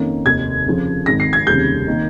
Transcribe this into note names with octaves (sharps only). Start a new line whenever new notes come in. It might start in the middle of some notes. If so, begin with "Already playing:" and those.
Already playing: F2 D#3 A#3 C#4
F1 D#2 D#3 G#6
F2 C#3 F3
G#1 G#2 D#3 A#6
C7
G#6
F1 D#2 C#3 G3 G6
D#3 A#3 D#4